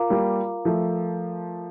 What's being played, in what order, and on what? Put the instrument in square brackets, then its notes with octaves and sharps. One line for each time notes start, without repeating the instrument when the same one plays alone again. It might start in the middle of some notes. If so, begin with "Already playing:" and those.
Already playing: [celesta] F4 A#4 F5 A#5 D6
[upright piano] G3 A#3
F3 A3